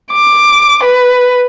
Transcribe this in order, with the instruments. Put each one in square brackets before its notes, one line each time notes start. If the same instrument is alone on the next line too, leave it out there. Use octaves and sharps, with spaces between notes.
[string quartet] D6
B4